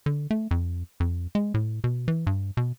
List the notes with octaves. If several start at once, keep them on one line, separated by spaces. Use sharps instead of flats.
D3
A3
F2
F2
G#3
A2
B2
E3
G2
B2